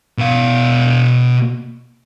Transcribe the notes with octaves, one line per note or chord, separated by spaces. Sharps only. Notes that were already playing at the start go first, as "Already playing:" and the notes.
B2 F5